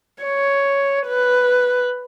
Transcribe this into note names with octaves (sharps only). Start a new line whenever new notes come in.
C#5
B4